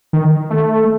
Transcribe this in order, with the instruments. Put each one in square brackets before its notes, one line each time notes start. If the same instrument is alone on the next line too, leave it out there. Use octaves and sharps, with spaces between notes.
[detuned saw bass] D#3
A3